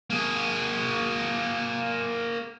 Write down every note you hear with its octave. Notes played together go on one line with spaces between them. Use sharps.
A#3 G#4